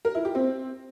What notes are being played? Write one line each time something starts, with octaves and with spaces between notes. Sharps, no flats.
A#4
E4
G4
C4